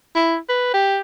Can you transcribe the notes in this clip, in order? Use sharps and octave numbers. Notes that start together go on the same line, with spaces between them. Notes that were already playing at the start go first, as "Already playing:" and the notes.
E4
B4
G4